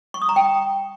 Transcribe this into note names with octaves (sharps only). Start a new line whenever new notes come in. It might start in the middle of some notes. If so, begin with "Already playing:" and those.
C#6
D#6
A#5
G5